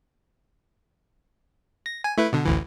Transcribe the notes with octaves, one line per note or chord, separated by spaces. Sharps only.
A#6
G#5
A3 E4 B4
B2 D3
A1 D2 E3